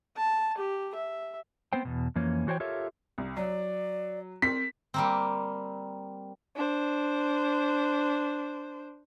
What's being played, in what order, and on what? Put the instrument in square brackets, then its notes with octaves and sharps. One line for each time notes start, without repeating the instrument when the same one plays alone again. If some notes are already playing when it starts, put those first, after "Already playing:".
[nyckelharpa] A5
G4
E5
[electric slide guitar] B3 C4 C5 G5
E2 B2
F2 E3 A#3 C#4
E3 F#4 C5 C#5 G5
F4 G4 A4 A#4 C#5 E5
[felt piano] C2
[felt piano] F#3 [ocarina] D5
[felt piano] C4 A#4 [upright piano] B6
[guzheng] G3 A#3 C4
[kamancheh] D4 C5